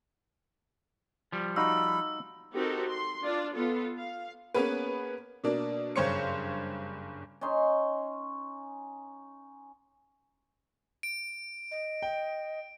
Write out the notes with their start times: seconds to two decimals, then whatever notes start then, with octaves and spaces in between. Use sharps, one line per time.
1.32 F3 G3
1.56 D#4 F#4 F5 B5 E6
2.54 C4 D#4 F#4 G4 A4 A#4
2.87 C6
3.24 D4 F4 D5
3.55 B3 F4 A4
3.97 F5
4.54 A#3 B3 C#4 G#4 B4
5.44 B2 A#3 D4
5.96 F#1 G2 C5 C#5 C#6 C#7
7.41 C#4 D#4 C6
11.03 D7
11.71 D#5
12.02 G5